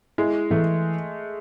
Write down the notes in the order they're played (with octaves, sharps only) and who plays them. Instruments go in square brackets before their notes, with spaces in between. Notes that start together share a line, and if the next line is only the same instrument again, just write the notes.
[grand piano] G#3 [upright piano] E4
[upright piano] E3 [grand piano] A3